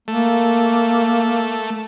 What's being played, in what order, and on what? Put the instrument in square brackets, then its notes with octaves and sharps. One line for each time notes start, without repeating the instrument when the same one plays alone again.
[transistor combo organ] A3 [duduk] A#3